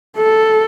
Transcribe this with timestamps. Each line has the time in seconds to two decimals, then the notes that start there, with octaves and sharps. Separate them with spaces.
0.17 A4